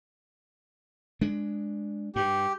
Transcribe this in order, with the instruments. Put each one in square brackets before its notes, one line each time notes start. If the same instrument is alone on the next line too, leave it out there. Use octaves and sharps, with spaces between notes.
[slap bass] G#3 D4
[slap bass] G2 [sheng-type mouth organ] G4